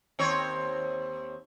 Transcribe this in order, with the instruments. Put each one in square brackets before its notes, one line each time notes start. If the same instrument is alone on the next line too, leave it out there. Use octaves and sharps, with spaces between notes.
[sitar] D#2 C4 C#5